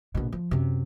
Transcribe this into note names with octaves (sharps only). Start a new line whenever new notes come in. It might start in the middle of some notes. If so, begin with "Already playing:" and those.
A#1 B2
F3
F#2 C3